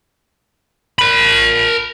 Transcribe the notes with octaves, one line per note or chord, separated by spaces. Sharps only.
A#4 B5